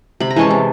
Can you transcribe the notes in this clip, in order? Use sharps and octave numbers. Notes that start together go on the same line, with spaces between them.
C3 B5
A#5
E3 G#3 C#4 G#5 A5
C3